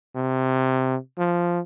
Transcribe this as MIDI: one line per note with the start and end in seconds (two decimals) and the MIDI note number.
0.15 0.96 48
1.18 1.60 53